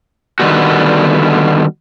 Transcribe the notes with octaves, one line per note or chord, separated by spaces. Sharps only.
D3 D#3 G3 B3 F#4